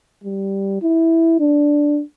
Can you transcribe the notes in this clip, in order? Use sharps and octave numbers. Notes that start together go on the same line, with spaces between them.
G3
E4
D4